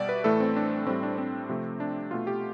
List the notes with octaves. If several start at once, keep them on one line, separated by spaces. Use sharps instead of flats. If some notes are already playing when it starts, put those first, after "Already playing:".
Already playing: B2 G3 D5 E5
B4
A2 E3 A3 A4
C4
D4
A2 G3 C4
D4
C4
C3 F3 A3
D4
B2 A3 F4
G4